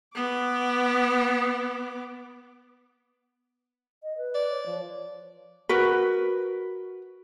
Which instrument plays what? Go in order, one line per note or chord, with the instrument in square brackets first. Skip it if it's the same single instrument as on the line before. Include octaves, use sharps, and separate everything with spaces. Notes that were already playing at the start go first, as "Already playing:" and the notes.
[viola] B3 D6
[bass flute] D#5
B4
[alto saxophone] D5
[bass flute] C#5
F3
[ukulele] F#4 A#4 B4